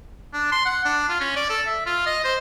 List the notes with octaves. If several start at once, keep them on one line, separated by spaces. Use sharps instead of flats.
D4
C6
F#5
D4
F4
C#4
D5
A4
E5
F4
D#5
C5